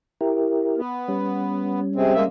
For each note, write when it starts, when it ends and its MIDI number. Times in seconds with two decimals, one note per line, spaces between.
0.21 0.81 64
0.21 0.81 67
0.21 0.81 70
0.78 1.80 59
1.08 2.29 55
1.08 2.29 61
1.96 2.14 48
1.96 2.14 56
1.96 2.14 60
2.14 2.23 56
2.14 2.23 58
2.14 2.23 76